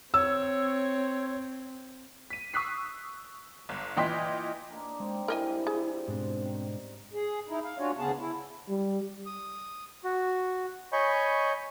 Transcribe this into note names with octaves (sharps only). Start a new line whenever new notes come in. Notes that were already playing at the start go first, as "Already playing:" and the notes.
C4 C#5 E6
B6 D#7
C#6 D#6 E6 F#6 B6 C7
G1
A#2 E3 D#5 G5 C6 B6
A#3 D4 D#4
G#3 C4
G2 E4 A#4 D#5 E5 G5 G#5
G#4
G#2 B2 C4 D4
D#3
G#4
D#4 E4
F5
C#4 D4 F4 F#4 C#5
D2 C#3 B3 G#4 A5
E4
G3
D#6
F#4
C#5 D#5 G#5 B5 C#6 G6